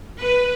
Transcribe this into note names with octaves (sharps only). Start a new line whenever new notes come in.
B4